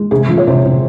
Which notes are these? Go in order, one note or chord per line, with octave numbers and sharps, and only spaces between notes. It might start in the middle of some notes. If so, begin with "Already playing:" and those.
Already playing: G#3
C3 G#4
F3
C#5
C3 C5
C3